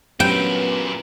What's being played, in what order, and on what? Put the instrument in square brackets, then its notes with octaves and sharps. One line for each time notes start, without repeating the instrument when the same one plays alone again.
[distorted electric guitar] A#2 E4 [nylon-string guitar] F#3 C#4 G4 [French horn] B3 [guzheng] G5